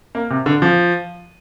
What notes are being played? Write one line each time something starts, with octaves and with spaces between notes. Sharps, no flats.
A#3
C3
D3
F3